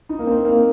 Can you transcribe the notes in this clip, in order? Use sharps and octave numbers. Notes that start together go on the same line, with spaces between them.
D#4
A#3
C4
A#3